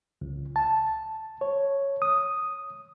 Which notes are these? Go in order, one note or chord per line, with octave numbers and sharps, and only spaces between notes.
C#2
A5
C#5
D#6